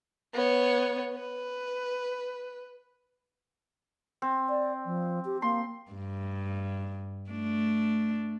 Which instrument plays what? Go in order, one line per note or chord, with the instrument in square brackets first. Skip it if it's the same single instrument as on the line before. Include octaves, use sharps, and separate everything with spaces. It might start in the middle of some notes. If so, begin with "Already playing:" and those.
[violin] B3 C#5
B4
[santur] C4
[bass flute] D5
F3
G4
[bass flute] A#3 [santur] C6
[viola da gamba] G2
A3 D4